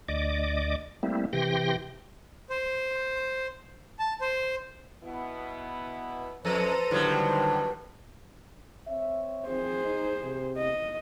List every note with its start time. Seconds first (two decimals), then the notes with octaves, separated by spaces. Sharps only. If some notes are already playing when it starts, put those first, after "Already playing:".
0.08 D2 D5 D#5 D6
1.03 G3 A3 A#3 C4 E4
1.33 C3 E3 G4 G5 C6 A#6
2.50 C5
3.99 A5
4.21 C5
5.04 B2 B3 E4
6.45 F2 A4 B4 C5 A#5 D#7
6.91 A2 D3 D#3 F#3 G3
8.88 C4 C#5 E5
9.48 D#3 F3 C4 G#4 C5
9.84 D#4
10.23 C3
10.58 D#5